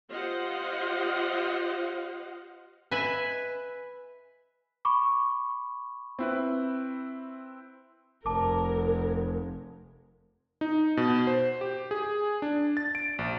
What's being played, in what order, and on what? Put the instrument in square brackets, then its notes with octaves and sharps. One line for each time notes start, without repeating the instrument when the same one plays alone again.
[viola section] F4 G4 C5 D#5 F5 F#5
[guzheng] B4 E5 G#5 B5
[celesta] B5 C#6 D6
[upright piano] C4 E4 B4
[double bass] F1 [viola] A#4 [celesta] A5 D6
[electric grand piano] D#4
B2
C5
G4
G#4
D4
A6
D7
A#1